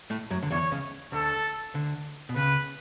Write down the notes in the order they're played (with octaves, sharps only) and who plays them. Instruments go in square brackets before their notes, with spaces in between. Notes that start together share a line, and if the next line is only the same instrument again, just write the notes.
[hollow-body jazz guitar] A2 A3
F#2 F#3
D3
[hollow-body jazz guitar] E2 E3 [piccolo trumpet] C#5
[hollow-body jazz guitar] C#2 C#3
[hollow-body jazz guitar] D2 D3 [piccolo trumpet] A4
[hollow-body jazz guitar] D2 D3
B2
[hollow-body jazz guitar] C#2 C#3 [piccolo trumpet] B4